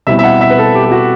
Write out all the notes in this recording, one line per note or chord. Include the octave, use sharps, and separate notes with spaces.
B2 G3 C4 E4 E5
E5
F#5
E5
B4
A4
G4
G4
F#4